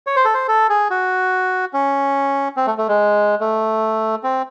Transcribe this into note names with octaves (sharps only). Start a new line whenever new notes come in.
C#5
C5
A4
C5
A4
G#4
F#4
C#4
C4
A3
A3
G#3
A3
C4